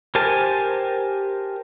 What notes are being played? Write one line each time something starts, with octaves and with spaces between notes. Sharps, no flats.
G4 A#4 C5 G#5 A5